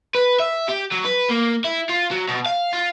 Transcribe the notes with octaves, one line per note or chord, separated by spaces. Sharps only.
B4
E5
G4
F#3
B4
A#3
E4
F4
F#3
B2
F5
F4